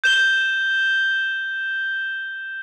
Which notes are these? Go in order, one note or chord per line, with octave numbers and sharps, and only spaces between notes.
G6 E7 G7